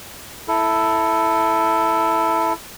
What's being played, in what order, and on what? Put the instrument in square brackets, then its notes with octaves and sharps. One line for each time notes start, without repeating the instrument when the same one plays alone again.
[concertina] E4 A4